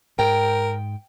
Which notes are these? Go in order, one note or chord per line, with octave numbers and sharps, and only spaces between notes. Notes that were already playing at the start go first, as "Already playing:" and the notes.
G#2 A#4 G5